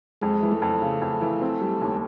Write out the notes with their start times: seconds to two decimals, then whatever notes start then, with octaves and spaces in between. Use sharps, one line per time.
0.21 F2 G#3
0.42 E3
0.52 A3
0.62 F2
0.82 C#3
1.01 F2
1.21 E3
1.41 C4
1.61 G3
1.81 D#2